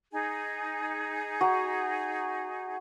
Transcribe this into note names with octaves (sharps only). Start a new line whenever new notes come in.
D#4 G#4
F#4 A#5